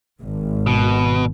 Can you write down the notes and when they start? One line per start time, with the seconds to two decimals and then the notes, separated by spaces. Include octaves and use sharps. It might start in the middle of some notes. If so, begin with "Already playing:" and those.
0.23 G#1
0.67 B2